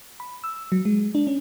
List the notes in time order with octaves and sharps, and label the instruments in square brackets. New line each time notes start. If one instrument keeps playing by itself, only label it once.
[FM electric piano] B5
E6
F#3
G#3
D4
C#4